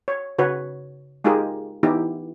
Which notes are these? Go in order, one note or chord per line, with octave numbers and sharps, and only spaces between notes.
C#5
C#3 F#4 B4 C#5
G#3 D#4 F4 G4 G#4 A#4
E3 B3 D#4 E4 G4